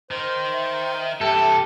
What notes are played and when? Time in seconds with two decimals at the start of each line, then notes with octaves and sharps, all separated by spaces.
0.11 D#3 C5
0.52 E5
1.21 G2 C3 G4 A4